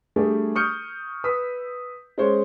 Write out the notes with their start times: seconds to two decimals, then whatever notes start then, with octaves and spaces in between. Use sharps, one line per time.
0.16 G3 A3 D4 G4 G#4
0.55 C#6 D#6 F6 G6 C#7
1.24 B4 D#6 E6 B6
2.18 G#3 C#4 C5 C#5